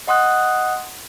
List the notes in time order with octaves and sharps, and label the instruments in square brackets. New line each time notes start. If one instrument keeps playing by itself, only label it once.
[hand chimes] D#5 F#5 C6 D#6 F#6